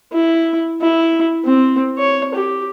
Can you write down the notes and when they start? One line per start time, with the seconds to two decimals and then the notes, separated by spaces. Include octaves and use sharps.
0.13 E4
0.81 E4
1.45 C4
1.98 C#5
2.35 G4